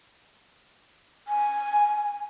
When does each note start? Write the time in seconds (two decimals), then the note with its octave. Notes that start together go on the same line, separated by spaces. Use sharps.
1.28 G#5